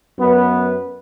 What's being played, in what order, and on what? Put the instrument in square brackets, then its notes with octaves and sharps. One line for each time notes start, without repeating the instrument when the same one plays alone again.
[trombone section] F#2 B3 B4